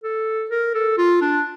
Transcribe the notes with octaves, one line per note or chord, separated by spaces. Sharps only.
A4
A#4
A4
F4
D4